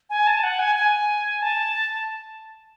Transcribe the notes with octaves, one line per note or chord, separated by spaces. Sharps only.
G#5
A5
F#5
G#5
G#5
A5